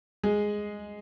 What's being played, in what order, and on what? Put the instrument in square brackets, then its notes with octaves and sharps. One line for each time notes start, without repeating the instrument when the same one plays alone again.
[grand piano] G#3 G#4